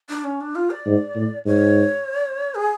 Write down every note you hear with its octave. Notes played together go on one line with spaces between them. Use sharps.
D4
C#4
D4
F4
D5
G#2
A2
G#2 C#5
G#4